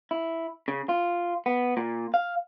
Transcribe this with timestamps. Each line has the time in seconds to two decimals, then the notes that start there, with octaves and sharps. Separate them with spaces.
0.11 E4
0.68 C#3
0.89 F4
1.46 B3
1.77 A#2
2.14 F5